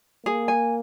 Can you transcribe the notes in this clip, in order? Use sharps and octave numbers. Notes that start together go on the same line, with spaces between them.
A#3 G#4
G#5